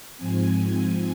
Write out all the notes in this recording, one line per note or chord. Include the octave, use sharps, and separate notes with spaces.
G#2 F3 C4 G#5